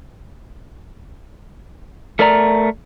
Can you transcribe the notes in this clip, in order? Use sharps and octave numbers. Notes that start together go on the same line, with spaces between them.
A3 A#4 D5 A#5